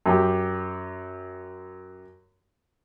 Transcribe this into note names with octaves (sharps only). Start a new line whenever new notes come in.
F#2 G4